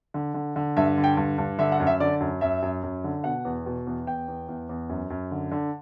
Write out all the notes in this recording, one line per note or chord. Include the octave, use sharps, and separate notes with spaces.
D3
D3
D3
G2 E5
D3
G5
G2
G2
D3 E5
F#5
F#2
E5
D3 D5
F#2
F#2 E5
F#2
F#2
D3
B2 F#5
E2
B2
E2
E2 G5
E2
E2
E2
F#2
F#2
D3
D3